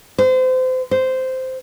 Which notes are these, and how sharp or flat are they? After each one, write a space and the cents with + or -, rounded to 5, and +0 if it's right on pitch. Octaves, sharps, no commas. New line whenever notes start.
C5 -30
C5 -10